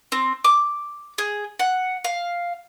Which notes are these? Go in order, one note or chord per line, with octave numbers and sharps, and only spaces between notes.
C4
D6
G#4
F#5
F5